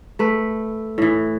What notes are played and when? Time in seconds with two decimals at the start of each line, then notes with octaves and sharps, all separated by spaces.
0.19 A3 B4
0.98 A2 E3